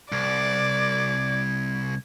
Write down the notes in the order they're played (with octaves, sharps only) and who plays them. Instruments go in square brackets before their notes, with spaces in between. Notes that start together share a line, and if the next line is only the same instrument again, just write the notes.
[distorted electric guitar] C2 [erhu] D5 [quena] G#6